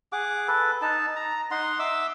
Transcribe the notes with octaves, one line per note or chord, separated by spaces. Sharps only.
G#4 F#5 D6
A4 B4
D#4 A5
A#5
D#4 F#5 C6
E5 D6 E6